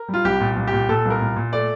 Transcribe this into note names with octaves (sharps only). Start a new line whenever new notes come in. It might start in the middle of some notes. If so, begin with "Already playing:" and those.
Already playing: A#4
G3
F4
C2 G4
A#2
C2
G4
A#2
A#2 A4
C2
A#4
A#2
A#2
A3 D5